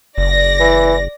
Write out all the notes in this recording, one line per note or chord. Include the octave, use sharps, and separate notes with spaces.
F#1 D5 A#6
E3